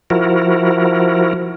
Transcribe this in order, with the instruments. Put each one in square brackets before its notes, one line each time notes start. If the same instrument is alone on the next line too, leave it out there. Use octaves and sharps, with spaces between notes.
[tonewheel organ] F3 E4 F#4 A#4